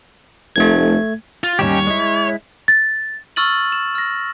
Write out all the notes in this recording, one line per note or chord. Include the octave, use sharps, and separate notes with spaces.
F1 A3 G#6
F4
D#2 G3 C#4 D#4 G4 C#5 E7
G#3 E4 D#5
A6
C#6 E6 F6 A6 D#7 F#7
E7
F6 A#6